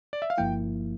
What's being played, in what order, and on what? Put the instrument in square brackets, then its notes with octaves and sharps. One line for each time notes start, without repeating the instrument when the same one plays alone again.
[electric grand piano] D5
E5
F5
[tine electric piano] G1 G2 F3 A#3 E4 [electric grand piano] G5